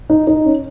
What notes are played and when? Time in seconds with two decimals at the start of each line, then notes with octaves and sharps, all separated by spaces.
0.10 D#4
0.27 D#4
0.45 C#4